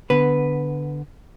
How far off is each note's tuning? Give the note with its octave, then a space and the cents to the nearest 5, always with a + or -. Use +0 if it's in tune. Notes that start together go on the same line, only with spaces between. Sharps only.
D3 +0 B3 +0 B4 +0